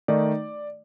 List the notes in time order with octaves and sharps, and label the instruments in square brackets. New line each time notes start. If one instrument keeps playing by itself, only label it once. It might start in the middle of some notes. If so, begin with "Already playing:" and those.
[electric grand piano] D#3 A3 D#4 D5